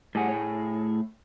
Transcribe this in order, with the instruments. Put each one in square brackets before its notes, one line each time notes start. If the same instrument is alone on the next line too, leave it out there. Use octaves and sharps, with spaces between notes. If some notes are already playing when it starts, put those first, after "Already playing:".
[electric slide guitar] A2 G#4 [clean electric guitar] G3 F#5
[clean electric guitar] A3 C#5